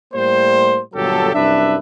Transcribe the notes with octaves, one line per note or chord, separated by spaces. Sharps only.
A2 G3 A#3 C5
G1 A#2 F#3 G4 A4
C2 F#2 D4 B4 E5